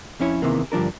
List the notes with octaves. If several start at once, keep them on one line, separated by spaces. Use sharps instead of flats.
F2 C#4 E4 C#5
E2 G2 C3 D#3 E3 A#3
G2 D3 F3 D4 A#4